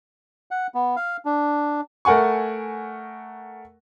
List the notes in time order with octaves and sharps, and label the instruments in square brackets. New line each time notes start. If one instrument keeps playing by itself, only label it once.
[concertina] F#5
B3
F5
D4
[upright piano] A3 A#4 F#5 G#5 C#6